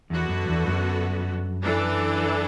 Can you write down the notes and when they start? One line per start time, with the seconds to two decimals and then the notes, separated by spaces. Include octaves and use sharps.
0.10 E2 D3 B3 F#4
0.29 F#2
0.48 E2
0.67 F#2
1.62 E3 D4 A4 D5